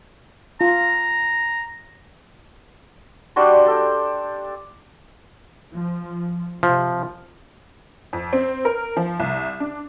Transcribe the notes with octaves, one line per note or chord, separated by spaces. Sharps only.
F4 A#5
G3 D4 F#4 C6
G4 A4
F3
C3 F3
F2
C4
A#4
F3
C2
D4